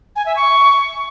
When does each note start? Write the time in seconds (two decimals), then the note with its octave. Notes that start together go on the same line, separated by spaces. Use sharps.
0.16 G#5
0.26 E5
0.36 C#6